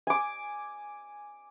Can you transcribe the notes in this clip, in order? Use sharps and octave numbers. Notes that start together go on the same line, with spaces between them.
G#5 D6